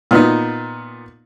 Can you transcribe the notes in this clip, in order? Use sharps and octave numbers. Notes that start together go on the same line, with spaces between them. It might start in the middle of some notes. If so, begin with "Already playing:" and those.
A#2 B3 D#4